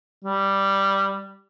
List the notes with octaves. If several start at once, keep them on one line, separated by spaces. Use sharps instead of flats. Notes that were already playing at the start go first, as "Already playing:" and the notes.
G3